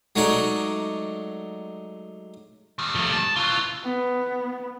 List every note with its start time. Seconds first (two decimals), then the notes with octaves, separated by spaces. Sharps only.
0.16 F#3 G#3 A3 D#4 C#5 D5
2.79 D#3 G3
2.95 F3 A3
3.12 A5
3.36 C#3 E3 F4
3.84 B3